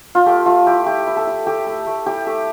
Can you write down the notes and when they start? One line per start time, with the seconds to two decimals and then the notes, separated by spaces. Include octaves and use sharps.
0.15 F4
0.26 A3 G4
0.46 A3 F4
0.66 E4 G4
0.86 E4 G4
1.07 E4
1.16 A4
1.27 E4
1.46 A3 G4
1.66 A3
1.87 A3
2.06 E4 G4
2.26 A3 G4